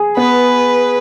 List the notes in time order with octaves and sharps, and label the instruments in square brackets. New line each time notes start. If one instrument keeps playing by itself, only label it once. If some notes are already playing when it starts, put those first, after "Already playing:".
Already playing: [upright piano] G#4
[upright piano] B3 [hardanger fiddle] B4